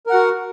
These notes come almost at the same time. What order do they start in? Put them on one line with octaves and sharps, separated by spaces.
A#4 F#5 F#4